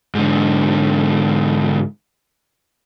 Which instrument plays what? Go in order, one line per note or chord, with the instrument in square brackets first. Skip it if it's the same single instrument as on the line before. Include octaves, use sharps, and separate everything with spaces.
[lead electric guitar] G#2 D3